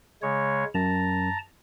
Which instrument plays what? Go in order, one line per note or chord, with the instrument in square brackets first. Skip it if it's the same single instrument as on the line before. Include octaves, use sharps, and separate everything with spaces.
[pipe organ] C#3 G#3 C#5
[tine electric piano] F#2 [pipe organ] A5 A#5